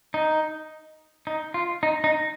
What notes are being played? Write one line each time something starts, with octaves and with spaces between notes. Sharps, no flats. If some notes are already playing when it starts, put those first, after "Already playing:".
D#4
D#4
F4
D#4
D#4